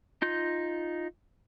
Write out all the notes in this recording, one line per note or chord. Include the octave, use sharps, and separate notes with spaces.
D#4 F4 G6